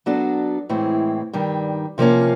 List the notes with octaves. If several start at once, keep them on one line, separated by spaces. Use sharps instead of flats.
F#3 B3 D4 F#4 A4
A2 E3 G#3 C4 E4
G2 D#3 G3
C3 F3 A#3 C#4